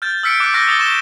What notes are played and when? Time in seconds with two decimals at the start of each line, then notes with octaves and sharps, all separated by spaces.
0.02 F6 G6 A6
0.23 E6 F6 B6 C#7 D7
0.40 D6 F#6 C#7 D7
0.54 C#6 D6 F6 G6 A#6 B6
0.68 D6 D#6 A6 G7
0.79 C#6 A#6 E7 G7